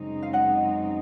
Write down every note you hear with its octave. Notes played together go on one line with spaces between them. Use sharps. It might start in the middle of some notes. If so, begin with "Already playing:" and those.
Already playing: F#2 C#3 G#3 C4 D#4
F5
D#5 F#5